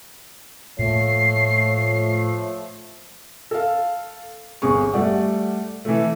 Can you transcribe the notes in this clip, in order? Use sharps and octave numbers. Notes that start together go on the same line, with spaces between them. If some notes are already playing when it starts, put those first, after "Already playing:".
A2 F3 A3 A#3 C#5 C7
A4 F5
G1 E2 G#4 C#6
G3 A3 D5 F#5
E3 A3